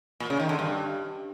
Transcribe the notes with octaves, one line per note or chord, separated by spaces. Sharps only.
A#2
C#3
D#3
D3
G2